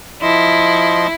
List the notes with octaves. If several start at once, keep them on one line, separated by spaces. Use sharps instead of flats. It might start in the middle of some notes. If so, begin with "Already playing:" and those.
F3 E4 D#5 C6